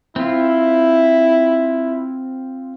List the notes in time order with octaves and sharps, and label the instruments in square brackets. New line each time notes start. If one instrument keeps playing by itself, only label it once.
[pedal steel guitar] C4 F4 [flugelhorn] E4